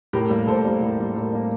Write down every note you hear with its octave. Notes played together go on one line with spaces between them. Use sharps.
A2 G4 A#4
G3 A#3
A2 A4 C5
G3 A#3
A2
G3 A#3
A2 G4 A#4
G3 A#3